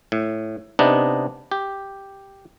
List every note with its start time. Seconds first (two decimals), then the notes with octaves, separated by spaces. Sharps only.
0.12 A2
0.79 C3 B3 D4 D#4
1.51 G4